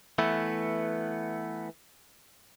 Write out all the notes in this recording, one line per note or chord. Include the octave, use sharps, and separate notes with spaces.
E3 A3 B3